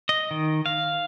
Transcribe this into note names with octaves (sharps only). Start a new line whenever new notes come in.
D#5
D#3
F5